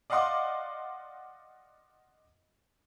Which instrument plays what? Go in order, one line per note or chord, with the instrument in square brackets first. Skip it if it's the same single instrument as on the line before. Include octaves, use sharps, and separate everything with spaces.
[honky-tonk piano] D5 D#5 F5 F#5 C6 D6